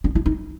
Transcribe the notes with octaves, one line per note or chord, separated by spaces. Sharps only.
D4
E4
D#4